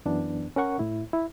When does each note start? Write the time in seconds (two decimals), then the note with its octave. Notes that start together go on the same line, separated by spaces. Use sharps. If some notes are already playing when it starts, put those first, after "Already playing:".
0.05 F#2 E3 B3 D4
0.56 C#4 A#4 F#5 C#6
0.79 A2 E4
1.13 E4